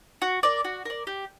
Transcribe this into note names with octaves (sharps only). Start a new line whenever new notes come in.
F#4
A#4 D5
F#4
A#4 D5
G4